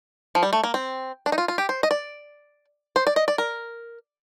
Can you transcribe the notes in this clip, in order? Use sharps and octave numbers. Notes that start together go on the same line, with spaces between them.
F3
G3
A3
A#3
C4
D4
D#4
F4
F4
G4
C5
D#5
D5
C5
D5
D#5
D5
A#4